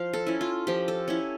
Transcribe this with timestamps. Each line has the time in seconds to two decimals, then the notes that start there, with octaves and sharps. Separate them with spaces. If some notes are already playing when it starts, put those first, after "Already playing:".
Already playing: F3 F5
0.13 A4
0.27 C#4 E4
0.41 F4
0.67 F3 G4
0.88 A4
1.08 C#4 E4 C#5